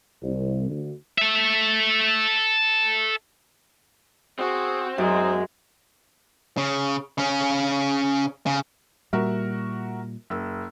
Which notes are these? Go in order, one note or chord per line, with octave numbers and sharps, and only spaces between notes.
C2
D2
A4 E5
C4 F#4 G#4
F#2 G#3 D#4
C#3
C#3 C#4
C#3
A#2 G3 F#4 A#4 E5
F#1 E6